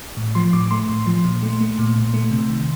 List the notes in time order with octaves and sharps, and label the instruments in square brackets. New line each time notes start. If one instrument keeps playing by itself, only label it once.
[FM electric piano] A2
F3 C6
A2 D6
A3 C6
A2
F3
A#2
A3
A3
A#2
A#2
A3
C3
D#3